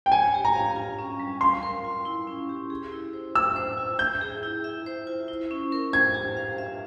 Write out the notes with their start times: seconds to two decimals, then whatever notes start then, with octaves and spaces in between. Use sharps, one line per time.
0.06 G5
0.12 C#5 G#5
0.34 G4
0.45 A#5
0.55 F5
0.76 F4
0.99 C#4
1.20 G3
1.41 F5 C6
1.63 A#4
1.85 F4
2.05 E4
2.27 C#4
2.49 G4
2.70 G#4
2.92 E4
3.13 C5
3.35 E5 E6
3.56 C5
3.78 F4
3.99 E5 G6
4.21 G#4
4.43 E4
4.64 E5
4.86 C5
5.07 F4
5.28 E4
5.51 C#4
5.72 A#4
5.93 C5 G#6
6.14 G4
6.37 F5
6.58 E5